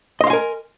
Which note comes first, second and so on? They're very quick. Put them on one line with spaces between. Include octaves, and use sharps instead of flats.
D#5 C6 F5 G#5 A#4